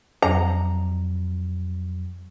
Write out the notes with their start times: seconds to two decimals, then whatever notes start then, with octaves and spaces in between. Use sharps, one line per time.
0.22 F2 F#3 A#5